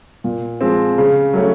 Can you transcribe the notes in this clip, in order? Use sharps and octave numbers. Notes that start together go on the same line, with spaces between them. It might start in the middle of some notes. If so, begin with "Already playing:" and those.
A#2
F3 G#3 C4
C#3
F#3 A3 C#4